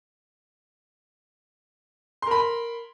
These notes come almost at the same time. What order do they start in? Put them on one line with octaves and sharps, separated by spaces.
C6 A#4 B5